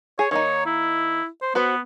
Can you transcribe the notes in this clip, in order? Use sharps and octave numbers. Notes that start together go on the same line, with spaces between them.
G#4 C#5
D#3 A#3 D#4 C#5
E4
C5
B3 F#4 B4 C5